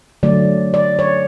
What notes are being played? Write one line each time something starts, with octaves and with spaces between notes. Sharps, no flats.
D3 F#3 A3 D5
D5
C#5